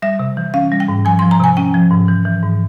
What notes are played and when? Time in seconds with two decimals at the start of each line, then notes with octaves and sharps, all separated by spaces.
0.02 G3 E5
0.19 C3
0.37 E3
0.54 C#4 F5
0.72 G3
0.80 G5
0.88 G#2
1.05 F3 G#5
1.19 F3 C6
1.31 A#5
1.39 C3 G#5
1.57 C#4 G5
1.74 F3
1.91 G#2
2.08 E3
2.25 E3
2.43 G#2